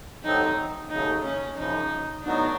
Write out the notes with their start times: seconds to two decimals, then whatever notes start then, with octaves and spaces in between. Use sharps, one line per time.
0.23 D#2 D3 F#3 A3 C4 D#4
0.90 D#2 C#3 F#3 A3 D#4
1.24 C#4
1.57 F#2 C#3 F3 D#4
2.23 A2 F#3 B3 D4 D#4 F#4